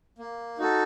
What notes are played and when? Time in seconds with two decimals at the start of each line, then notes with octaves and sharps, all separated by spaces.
0.18 A#3
0.58 D#4 F#4 A4